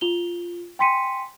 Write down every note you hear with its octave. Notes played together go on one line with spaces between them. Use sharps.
F4 F7 G7
G5 G#5 C6 B6 C#7 D#7